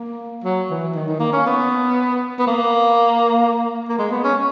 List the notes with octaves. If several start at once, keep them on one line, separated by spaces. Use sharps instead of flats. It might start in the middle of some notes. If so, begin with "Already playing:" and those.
Already playing: A#3
F#3
E3
D#3
D#3
A#3
C#4
B3
B3
A#3
A#3
G#3
B3
C#4